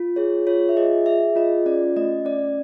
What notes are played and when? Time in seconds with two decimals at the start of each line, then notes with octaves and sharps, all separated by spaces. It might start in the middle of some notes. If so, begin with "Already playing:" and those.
Already playing: F4
0.16 G#4 C#5
0.46 F4 C#5
0.69 E5
0.77 G#4 D#5
1.06 G#4 E5
1.36 F4 D#5
1.66 C#4 D5
1.96 A3 D#5
2.25 C#4 D5